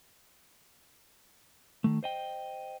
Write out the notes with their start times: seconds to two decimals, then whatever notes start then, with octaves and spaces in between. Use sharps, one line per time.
1.84 D#3 A3
2.03 C5 D#5 G5